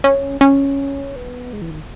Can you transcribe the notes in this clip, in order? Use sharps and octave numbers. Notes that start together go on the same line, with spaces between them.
C#4
C#4
B3
G#3
E3
D#3